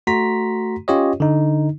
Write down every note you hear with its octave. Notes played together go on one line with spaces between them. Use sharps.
A3 F#4 A#5 C6 B6
C#4 F4 G4 C#5 D#5
D3 D#4